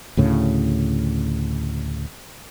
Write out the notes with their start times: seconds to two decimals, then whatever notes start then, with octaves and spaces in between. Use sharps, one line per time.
0.17 D2 A2 C#3